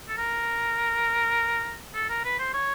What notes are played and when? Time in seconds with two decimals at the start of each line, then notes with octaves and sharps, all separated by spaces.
0.08 A4
0.17 A#4
1.94 A4
2.10 A#4
2.24 B4
2.39 C5
2.54 C#5